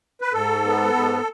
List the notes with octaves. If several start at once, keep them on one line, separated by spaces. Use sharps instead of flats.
B4
G#2 A4
B3
G#2